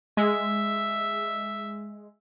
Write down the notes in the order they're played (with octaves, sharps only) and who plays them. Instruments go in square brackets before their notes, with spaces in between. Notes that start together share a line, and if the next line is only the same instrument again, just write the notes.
[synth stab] G#3 [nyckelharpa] E5